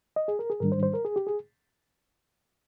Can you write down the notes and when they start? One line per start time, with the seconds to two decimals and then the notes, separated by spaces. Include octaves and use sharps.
0.16 D#5
0.28 G#4
0.39 A#4
0.50 G#4
0.60 G#2 D#3 G3 D4 A#4
0.72 C5
0.83 C5
0.94 A#4
1.05 G#4
1.16 G4
1.27 G#4